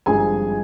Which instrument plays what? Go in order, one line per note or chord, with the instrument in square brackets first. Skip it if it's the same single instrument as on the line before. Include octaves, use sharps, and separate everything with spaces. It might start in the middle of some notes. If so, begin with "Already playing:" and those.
[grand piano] G#1 G2 F3 C4 G#4 G#5